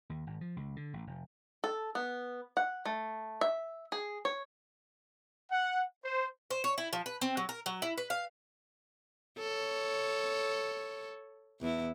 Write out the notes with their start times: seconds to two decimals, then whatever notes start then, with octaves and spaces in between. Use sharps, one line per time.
0.10 D#2
0.27 G#1
0.41 F3
0.56 C#2
0.76 D3
0.93 A1
1.07 F1
1.64 A4
1.95 B3
2.57 F#5
2.85 A3
3.41 E5
3.92 G#4
4.25 C#5
5.51 F#5
6.04 C5
6.50 C5
6.64 C#5
6.78 E4
6.93 F3
7.06 B4
7.21 C4
7.37 F#3
7.49 A#4
7.66 F#3
7.82 E4
7.98 B4
8.10 F5
9.39 A4 C#5
11.60 E2 E4